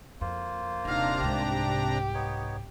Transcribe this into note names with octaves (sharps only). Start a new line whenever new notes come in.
F2 A#3 F4 C5
D#1 C3 D4 D#4 F5 A#5
C2 G#2 G4
B3 D#4 C#5